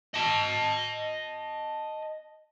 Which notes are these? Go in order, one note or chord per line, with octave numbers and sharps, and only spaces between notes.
D#5 A5